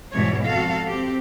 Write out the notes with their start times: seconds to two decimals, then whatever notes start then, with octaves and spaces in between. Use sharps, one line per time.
0.12 E2 G#2 B2 E3 G3 C#5
0.43 F2 F#4 A4 F5
0.87 C4 G4